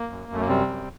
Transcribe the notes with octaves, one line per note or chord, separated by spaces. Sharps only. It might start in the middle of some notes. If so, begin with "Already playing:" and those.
Already playing: A#3
F#2
F#2 A3
A#3
C3 G3 C4
F#2